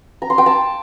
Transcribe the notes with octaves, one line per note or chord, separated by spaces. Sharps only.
A#5
C6
G5
A5